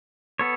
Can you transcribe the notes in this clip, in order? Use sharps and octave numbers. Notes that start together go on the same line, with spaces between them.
B3 A4 C#5